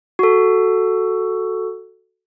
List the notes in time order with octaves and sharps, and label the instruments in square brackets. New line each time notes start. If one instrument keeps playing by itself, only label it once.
[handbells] F#4 A4